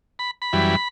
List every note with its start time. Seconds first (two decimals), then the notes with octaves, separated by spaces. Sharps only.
0.19 B5
0.42 B5
0.53 F#2 E3 G3